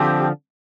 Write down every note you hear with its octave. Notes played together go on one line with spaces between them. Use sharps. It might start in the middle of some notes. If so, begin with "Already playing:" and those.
Already playing: D3 F3 C4 G4